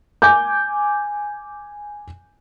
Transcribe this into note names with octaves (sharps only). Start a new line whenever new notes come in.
G#5 D6 G6